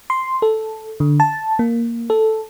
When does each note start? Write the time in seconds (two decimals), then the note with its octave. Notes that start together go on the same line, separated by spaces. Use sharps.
0.10 C6
0.42 A4
1.00 D3
1.20 A5
1.59 A#3
2.10 A4